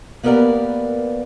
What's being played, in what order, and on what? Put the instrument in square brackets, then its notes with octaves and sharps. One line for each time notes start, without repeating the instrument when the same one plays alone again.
[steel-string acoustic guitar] A#3 B3 G4 A#4 B4 D5